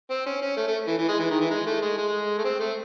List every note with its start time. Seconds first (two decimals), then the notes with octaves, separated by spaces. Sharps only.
0.10 C4
0.26 C#4
0.42 C#4
0.57 A3
0.67 A3
0.88 E3
0.98 E3
1.08 G#3
1.19 E3
1.30 D#3
1.40 E3
1.50 G#3
1.66 A3
1.82 G#3
1.97 G#3
2.38 A3
2.44 C4
2.59 A3